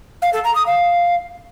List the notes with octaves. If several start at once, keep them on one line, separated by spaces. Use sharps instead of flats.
F5
A4
A#5
D#6
F5